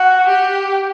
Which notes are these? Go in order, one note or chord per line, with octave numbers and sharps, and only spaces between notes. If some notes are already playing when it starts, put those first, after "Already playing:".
Already playing: F#4
G4